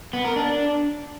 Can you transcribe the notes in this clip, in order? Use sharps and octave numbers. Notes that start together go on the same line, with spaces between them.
B3
A#4
D4